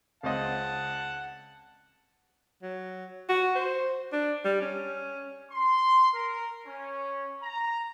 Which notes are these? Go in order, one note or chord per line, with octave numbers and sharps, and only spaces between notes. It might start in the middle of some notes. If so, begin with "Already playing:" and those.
C#2 C4 D#5 F#5 A5
F#3
F#4
C5
D4
G3
C#4
C6
A#4
C#4
A#5